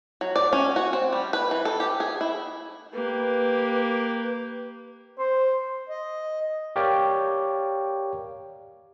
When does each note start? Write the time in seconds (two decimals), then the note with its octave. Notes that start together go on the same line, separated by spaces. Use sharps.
0.21 F#3
0.36 D5
0.53 C#4
0.76 F#4
0.93 C4
1.13 G3
1.33 B4
1.51 E3
1.65 A4
1.80 G4
2.00 G#4
2.21 E4
2.93 A#3 G4 B4
5.18 C5
5.89 D#5
6.76 G4 A#4 C#5 D5 F5 G5